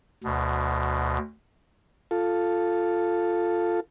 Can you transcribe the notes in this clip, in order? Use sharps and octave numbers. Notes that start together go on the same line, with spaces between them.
D2 B2
F4 A4